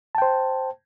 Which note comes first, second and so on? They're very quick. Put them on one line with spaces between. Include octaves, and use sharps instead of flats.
A5 G5 C5